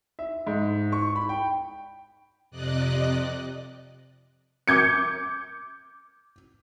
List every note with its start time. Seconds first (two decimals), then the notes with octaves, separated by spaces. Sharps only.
0.19 E5
0.47 G#2
0.92 C#6
1.16 B5
1.29 G5
2.51 F2 C3 D5 D#5 F#6
4.68 D6 G6 G#6 C#7